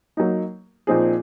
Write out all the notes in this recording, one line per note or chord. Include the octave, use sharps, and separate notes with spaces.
F#3 A#3 D#4
A#2 F3 C4 D#4 G#4